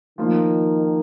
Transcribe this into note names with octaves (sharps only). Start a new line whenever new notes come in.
D#3 F3 A#3 F4